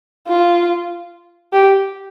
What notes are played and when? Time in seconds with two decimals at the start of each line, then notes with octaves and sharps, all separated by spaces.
0.28 F4
1.53 G4